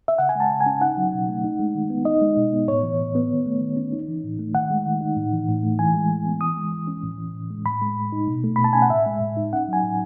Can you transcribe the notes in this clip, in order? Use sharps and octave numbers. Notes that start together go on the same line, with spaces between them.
E5
C#3 F#5
G#5
G#3 A5
C#3
G#5
C#4
D#4 F#5
F#3
B2
A3
D#4
G#3
D#3
B3
D#4 D#5
G#3
B2
B3
A2 C#5
E3
A2
B3
D#3
A3
D#3
C#4
D#4
E3
A2
A3
D#3 F#5
G#3
D#3
D#4
A2
E3
A2
A3
E3 G#5
G#3
E3
B3
E3 D#6
G#3
E3
C#4
A2
E3
A2
G#3
A2 B5
G#3
A2
D#4
B2
A3
B2 B5
A5
C#4 G#5
F#5
A2 E5
G#3
A2
D#4
C#4 F#5
F#3 G#5
A2